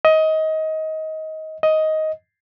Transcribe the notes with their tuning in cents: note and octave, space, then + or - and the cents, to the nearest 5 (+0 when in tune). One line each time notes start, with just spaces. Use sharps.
D#5 +20
D#5 +10